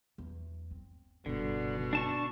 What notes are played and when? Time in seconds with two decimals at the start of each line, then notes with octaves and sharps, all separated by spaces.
0.18 E2 F#3
0.71 C4
1.26 F#1 G2 B2 D3
1.93 D4 A5 C#6